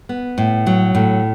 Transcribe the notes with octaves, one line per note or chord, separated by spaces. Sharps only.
B3
A2
F#3
A2